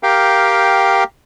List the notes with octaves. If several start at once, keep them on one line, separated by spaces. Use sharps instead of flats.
G4 A#4 F5 G5